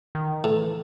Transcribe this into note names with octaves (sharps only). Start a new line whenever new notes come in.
D#3
A2 E3